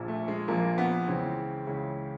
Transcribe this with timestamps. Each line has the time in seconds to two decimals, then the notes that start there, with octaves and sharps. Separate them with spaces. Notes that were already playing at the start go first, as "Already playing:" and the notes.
Already playing: A#1 A#2 F3
0.08 A3
0.28 G#3
0.48 A#1 A#2 F3 A#3
0.78 B3
1.07 C#2 C#3 E3 C4
1.67 C#2 C#3 E3